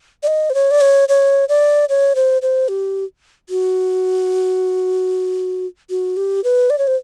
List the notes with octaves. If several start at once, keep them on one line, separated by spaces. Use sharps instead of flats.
D5
D#5
C5
C#5
D5
C#5
C#5
D5
C#5
C5
C5
G4
F#4
F#4
G4
B4
D5
C#5
C5